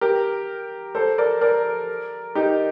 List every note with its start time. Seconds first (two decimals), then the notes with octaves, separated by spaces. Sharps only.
0.01 G4 A#4
0.95 A4 C5
1.18 A#4 D5
1.41 A#4 D5
2.35 D#4 G4